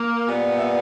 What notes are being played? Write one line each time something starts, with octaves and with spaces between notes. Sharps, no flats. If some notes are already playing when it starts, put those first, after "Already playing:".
Already playing: A#3
A#2 G3 B3
E5